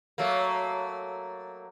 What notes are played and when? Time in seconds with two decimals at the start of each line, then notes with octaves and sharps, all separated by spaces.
0.18 F#3 A3 A#3